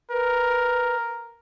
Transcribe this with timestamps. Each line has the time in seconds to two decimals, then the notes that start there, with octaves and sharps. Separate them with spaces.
0.11 A#4 B4